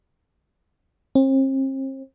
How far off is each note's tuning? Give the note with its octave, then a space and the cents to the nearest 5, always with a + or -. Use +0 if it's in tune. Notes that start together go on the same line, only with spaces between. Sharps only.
C4 +40